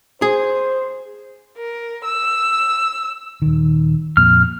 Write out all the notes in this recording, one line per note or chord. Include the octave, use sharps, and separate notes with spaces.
G#4 C5
A#4
E6
D#1 D#3
F2 A#2 F6